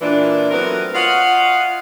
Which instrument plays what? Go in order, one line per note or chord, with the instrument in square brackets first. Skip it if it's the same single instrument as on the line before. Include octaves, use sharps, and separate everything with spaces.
[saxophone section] A#2 E3 D4
F#3 A3 B3 C4 A#4 B4
F4 C#5 D#5 F5 F#5